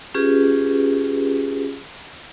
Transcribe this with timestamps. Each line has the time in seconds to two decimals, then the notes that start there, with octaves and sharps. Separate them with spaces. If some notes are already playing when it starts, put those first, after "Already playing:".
0.14 C#4 F4 G4 G#4 B4